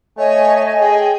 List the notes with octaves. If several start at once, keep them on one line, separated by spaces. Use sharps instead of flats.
A3 C#5 D#5 G#5
G#4 G5